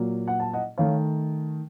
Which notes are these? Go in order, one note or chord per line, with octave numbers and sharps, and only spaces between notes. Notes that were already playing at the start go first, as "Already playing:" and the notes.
Already playing: A#2 F#3 A#3
F#5
A5
D#5 F#5
D#3 A3 C#5 F5